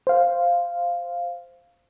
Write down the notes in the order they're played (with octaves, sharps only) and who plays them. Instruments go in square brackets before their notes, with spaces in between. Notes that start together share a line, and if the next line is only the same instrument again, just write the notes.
[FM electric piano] C5 F5